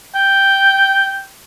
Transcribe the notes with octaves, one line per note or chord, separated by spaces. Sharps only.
G5